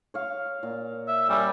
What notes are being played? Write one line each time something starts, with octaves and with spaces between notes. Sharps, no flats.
C#5 F5
A#2
E5
G3 A#4 C#5 G#5